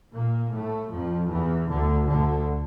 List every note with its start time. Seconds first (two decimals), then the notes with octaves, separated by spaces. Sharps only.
0.14 A#2 A#3
0.54 A2 A3
0.92 F2 F3
1.31 E2 E3
1.70 D2 D3
2.09 D2 D3